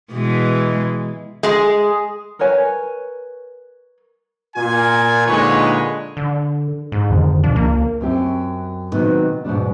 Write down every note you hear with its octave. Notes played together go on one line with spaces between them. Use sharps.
B2 E3 G#3
G#3 G#4
A#4 B4 C#5 G#5
A#2 F4 G#5
A#2 D3 G#3 D#4 B4 C#5
D3
G#2
F2 D3 D#3
D#2 B2 F3 D4
C#2 A#3
F#2 C4 G4
C3 D#3 F#3 B3 D#4
E2 G#2 B2 G3 D4